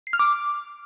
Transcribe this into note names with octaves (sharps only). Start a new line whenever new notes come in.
C7
F6
D6